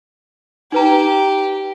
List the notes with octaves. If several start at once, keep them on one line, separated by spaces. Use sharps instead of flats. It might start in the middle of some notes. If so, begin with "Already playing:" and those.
D#4 G4 B4 A#5